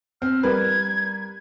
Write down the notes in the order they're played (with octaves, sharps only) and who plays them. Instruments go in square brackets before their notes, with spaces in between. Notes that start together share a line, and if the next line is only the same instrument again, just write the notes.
[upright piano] C4 [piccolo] F6
[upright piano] G3 A#4 B4 [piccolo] G#6